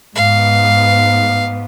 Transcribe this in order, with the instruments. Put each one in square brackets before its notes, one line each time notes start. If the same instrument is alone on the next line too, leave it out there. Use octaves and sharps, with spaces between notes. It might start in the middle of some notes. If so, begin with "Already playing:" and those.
[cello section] G#2 B3 [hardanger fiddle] F5